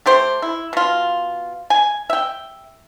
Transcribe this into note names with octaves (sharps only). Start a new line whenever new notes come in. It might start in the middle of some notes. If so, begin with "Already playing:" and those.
A3 G4 C5
E4
B2 F4
G#5
E5 G5